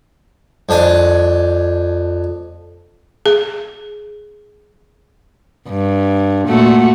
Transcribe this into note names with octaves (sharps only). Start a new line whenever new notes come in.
F2 D4 G#5
G#4
G2
A#2 A3 F#4